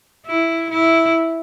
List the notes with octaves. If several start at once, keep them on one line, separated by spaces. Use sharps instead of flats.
E4
E4